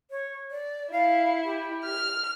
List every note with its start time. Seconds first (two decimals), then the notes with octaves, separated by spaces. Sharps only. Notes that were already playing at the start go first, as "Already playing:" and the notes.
0.11 C#5
0.51 D5
0.92 E4 F5
1.44 G4
1.85 F6